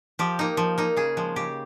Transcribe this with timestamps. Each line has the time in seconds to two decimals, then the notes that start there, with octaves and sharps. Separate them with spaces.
0.19 F3 G4
0.39 A#3 D#4
0.57 F3
0.78 A#3 D#4
0.97 C#3 G#4
1.17 F3 G#3
1.36 C#3 G4